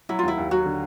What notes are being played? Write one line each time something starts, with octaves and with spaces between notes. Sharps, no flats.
F#3 E4
F4
D#2 E4
D#2
F#3 F#4
D3